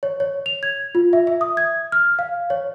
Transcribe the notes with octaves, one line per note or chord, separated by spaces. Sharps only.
C#5
C#5
F7
G#6
F4
E5
E5
D#6
G#6
F6
F5
C#5